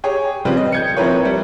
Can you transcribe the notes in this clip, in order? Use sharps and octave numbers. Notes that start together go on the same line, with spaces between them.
G4 G#4 C#5
C#3 F3 G3 C4 B4
D#5
G6 G#6 C#7
F3 C4 E4 A#4 B4 C#5
G3